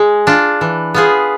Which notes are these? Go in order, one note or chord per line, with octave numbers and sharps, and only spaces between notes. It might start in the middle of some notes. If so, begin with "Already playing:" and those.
Already playing: G#3
D4 F4
E3
B3 F4 G#4